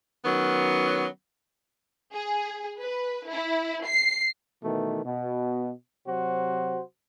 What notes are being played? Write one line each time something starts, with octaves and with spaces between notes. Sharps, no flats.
D#3 F#3 B3 C#4
G#4
B4
E4
C7
B2 D#3 E3 A3
B2
C3 F#3 F#4 C5